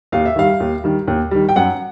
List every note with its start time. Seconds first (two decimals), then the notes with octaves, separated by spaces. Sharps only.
0.12 D#2 F5
0.25 E5
0.36 D#3 G3 F5
0.60 D#2
0.84 D#3 G3
1.08 D#2
1.31 D#3 G3
1.49 G5
1.56 F#2 F#5